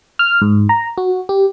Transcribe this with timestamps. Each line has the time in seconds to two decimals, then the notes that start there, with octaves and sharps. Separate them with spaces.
0.19 F6
0.42 G#2
0.69 A#5
0.98 F#4
1.29 G4